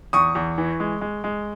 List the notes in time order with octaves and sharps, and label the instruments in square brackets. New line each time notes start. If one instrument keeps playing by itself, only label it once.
[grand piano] E2 C#6 D#6
E2
E3
G#3
G#3
G#3